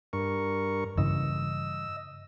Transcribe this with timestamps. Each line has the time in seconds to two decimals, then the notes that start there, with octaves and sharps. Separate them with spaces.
0.13 G2 A#4 C#6
0.98 G2 C#3 E3 D#5 E6